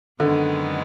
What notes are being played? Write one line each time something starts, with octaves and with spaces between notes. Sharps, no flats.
F#2 D3 D#3 G#3 B3